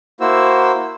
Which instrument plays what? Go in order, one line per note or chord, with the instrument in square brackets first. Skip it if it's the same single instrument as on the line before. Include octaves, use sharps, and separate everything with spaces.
[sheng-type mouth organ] A#3 E4 F#4 C5 E6